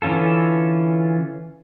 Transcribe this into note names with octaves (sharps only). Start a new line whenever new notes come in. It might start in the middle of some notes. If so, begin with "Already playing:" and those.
D3 E3 C#4 F4 A4